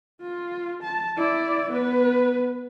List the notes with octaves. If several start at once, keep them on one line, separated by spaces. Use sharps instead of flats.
F4
A5
E4 D5
B3 B4